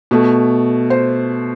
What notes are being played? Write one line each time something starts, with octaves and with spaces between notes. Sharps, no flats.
B2 A3
C5